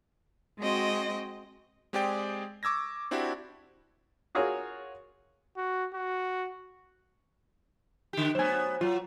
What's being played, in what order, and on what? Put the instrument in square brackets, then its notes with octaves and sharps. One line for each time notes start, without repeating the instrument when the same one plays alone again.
[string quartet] G#3 C4 F#4 D#5 G5
[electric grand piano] G#3 C4 G4 G#4 D5 G5
C#6 D6 E6 G#6 A#6
C4 D4 E4 F#4 G4
[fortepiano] F4 F#4 G#4 A#4 C#5
[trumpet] F#4
F#4
[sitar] D3 G4
[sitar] F#3 B3 [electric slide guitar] C5 G#5
[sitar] F#3 [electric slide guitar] F4